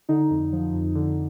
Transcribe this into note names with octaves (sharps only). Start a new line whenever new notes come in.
D3 D#4
F2
F3
F2
D3